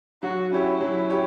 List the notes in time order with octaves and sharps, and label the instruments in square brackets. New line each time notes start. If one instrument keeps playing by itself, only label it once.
[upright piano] F#3 [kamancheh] F#4
[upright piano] C#4 G4 C#5 [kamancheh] E4
[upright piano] F#3
G4 C#5